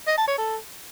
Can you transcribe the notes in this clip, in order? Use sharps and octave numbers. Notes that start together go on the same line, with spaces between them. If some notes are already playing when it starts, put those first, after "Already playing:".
D#5
A5
C#5
A4